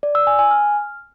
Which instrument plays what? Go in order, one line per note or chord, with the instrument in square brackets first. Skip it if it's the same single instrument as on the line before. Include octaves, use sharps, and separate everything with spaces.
[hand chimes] D5
E6
G#5
G#5
F6